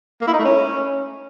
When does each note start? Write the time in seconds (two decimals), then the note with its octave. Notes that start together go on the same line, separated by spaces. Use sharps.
0.21 A#3
0.27 E4
0.33 D#4
0.39 A3
0.45 C#4